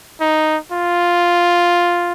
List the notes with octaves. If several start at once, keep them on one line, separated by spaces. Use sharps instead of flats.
D#4
F4